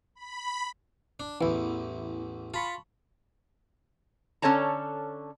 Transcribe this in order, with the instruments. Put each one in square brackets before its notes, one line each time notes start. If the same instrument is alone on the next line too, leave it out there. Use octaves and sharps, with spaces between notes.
[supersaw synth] B5
[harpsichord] D4
[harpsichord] A1 E2 [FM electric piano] E3 B3 E4
[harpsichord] F4 [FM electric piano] A5 B5 C#6
[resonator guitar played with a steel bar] D3 C#4 A4 C#5 A5 A#5